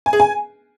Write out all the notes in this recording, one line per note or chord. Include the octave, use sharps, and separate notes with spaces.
G#5
G#4
G#5